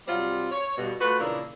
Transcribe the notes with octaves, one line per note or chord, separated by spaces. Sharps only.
C3 F#3 G3 C4 F4
C#5
G2 B2 D3
A3 F4 F#4 B4
A#2 C#3 E3 A#3 D4 E4